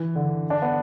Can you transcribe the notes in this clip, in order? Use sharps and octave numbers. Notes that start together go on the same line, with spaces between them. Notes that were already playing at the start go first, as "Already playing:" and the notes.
Already playing: E3
D3
D4
B3